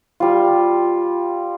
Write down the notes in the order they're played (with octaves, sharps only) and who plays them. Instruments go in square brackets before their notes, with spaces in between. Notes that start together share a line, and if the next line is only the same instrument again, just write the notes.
[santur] G3 F4